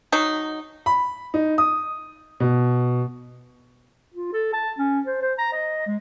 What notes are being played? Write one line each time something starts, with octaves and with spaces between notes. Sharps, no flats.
F#3 D#4
B5
D#4
D#6
B2
F4
A4
A5
C#4
C5
C5
A#5
D#5
G#3